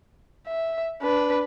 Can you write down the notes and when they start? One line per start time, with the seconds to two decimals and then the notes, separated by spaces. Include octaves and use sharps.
0.47 E5
1.02 D4 B4